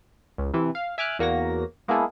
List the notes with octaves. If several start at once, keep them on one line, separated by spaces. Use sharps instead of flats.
C#2
C3 E3
F5
E5 G#5 D6 F6 F#6
E2 A#3 F#4 C#5 A#6
G#3 A#3 B3 E4 G#4 A4